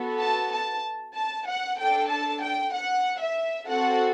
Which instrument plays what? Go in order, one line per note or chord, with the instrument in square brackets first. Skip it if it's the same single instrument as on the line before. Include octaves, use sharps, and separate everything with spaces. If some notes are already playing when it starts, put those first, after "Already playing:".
Already playing: [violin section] B3 F#4 A4
A5
A5
A5
F#5
D4 A4 G5
A5
G5
F#5
E5
C4 F#4 A4 F#5